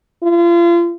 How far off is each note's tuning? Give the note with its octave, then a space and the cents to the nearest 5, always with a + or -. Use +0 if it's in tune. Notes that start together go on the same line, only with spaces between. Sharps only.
F4 -35